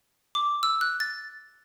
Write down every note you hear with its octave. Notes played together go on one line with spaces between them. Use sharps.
D6
E6
F#6
A6